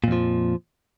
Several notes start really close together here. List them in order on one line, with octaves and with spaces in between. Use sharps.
A#2 F2 F3